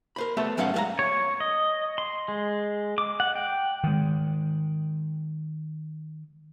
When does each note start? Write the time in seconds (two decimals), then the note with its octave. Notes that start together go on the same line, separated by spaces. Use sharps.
0.16 A#4 C5 B5
0.37 A3 B3 G4 C#5 E5
0.57 G#2 F#3 C#4 C5 F5 F#5
0.74 G3 G#3 A#4 E5 F5 A#5
0.99 C#5
1.40 D#5
1.98 C6
2.28 G#3
2.98 D6
3.20 F#5
3.35 G5
3.84 D#3 G#3